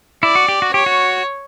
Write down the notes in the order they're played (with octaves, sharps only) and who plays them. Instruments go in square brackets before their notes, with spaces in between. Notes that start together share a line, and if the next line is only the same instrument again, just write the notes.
[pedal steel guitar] E4 [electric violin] D5
[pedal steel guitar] F#4
G4
F#4
[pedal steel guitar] G4 [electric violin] C#5
[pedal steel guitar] F#4